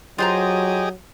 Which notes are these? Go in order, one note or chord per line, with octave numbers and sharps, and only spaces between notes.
F#3 F4 G4 G#4 C5 D#5 A#5